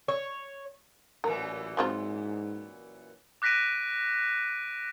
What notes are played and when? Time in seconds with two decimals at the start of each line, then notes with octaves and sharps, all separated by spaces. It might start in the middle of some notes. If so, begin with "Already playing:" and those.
0.08 C#5
1.24 A1 F#2 A#2 E3 A#4
1.77 G#2 F#3 C4 F4
3.42 D6 F#6 A#6 B6 D7 D#7